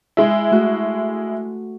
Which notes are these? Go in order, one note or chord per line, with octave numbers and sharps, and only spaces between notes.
G#3 E4
A3 F#4